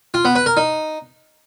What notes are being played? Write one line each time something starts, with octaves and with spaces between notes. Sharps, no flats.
F4
B3
B4
A#4
D#4